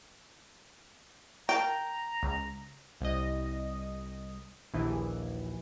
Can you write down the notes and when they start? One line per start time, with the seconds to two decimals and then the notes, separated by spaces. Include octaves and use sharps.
1.49 A#4 F5 G5 A5 A#5
2.23 C#2
3.01 C2 D#5
4.74 A#1 D#2 E3